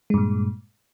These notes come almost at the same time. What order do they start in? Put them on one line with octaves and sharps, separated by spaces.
G#3 G2 A#2